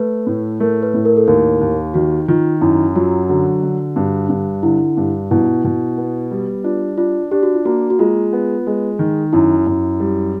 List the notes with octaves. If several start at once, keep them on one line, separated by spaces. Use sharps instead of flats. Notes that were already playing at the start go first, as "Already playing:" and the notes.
Already playing: A3 B4
A2
A3 A#4
B4
A2
A#4
A4
D#2 A#4
D#2
D#3 F#4
D#3 F4
F#2 E4
F#3 F4
D3 F#4
D3
G2
G2
D3 E4
G2
B2 E4
B2
B3
G3
D4 F4
D4 F4
D4 G4
F#4
F4
A#3 F#4
F#4
G#3 F4
B3
G#3
D#3
F#2 E4
F#2
G3